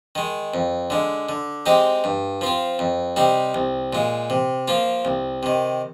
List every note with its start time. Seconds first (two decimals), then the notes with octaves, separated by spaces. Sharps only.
0.15 D#3 G#3
0.54 F2
0.90 D3 G#3
1.29 D3
1.66 G#3 C4 D#4 G4
2.04 G2
2.41 F3 C4 F4
2.79 F2
3.16 C3 G3 C4 D#4
3.54 C2
3.93 A#2 G#3
4.30 C3
4.68 F3 A#3 F4
5.05 C2
5.43 C3 D#3